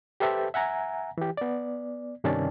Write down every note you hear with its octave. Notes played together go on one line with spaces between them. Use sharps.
G4 A4 B4 C5 E5 A5
E5 F#5 G#5 A#5
E3 G4
B3 D5
G2 C3 D#3 C#4 D5 A5